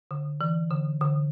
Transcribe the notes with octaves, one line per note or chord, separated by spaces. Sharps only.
D3
E3
D3
D3